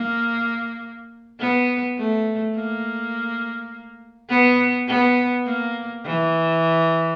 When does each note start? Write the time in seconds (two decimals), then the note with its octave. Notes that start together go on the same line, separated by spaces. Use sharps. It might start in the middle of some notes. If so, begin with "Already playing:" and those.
Already playing: A#3
1.40 B3
1.98 A3
2.56 A#3
4.29 B3
4.88 B3
5.46 A#3
6.05 E3